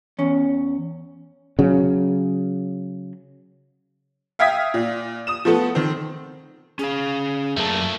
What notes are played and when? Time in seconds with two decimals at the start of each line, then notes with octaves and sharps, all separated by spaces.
0.18 E2 C#4
1.59 C#3 F#3
4.39 E5 F5 G5 D#6 G#6 B6
4.74 A#2
5.27 D#6 E7
5.45 F3 A3 B3 A4
5.75 D#3 C4
6.79 C#4 G#4 F5
7.57 F#2 A#2 A3 A#4 A5